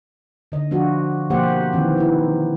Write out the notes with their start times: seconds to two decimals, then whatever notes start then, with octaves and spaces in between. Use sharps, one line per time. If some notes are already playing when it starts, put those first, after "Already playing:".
0.52 D3 D#5
0.71 F3 D4 F4 F#4
1.30 B2 F3 A#3 G4 C5 F#5
1.73 D#3 E3 C4
1.97 D#4 E4